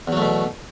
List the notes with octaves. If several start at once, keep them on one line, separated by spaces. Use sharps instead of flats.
E2 B2 F#3 A3